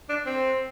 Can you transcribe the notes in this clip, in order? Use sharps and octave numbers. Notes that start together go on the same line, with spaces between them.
D4
C4